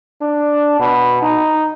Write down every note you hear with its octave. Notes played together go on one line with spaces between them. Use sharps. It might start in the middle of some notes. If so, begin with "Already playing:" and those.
D4
B2
D#4